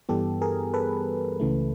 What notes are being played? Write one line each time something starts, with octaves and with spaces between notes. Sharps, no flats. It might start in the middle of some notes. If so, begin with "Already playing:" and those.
G2 E3 G3 B3 G4 A4
G#4 A#4
A4 B4
C#2 C#3 E3 A3